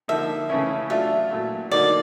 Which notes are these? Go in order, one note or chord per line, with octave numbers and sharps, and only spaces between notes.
D3 F3 A#3 D#4 E5
C#3 E3 A3 C#4 E4
F#3 A3 D4 F4 E5
A#2 F#3 A3
D3 F#3 A#3 D#4 D5